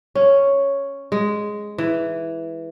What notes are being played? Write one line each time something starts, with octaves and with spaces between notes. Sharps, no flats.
C#4
G#3
E3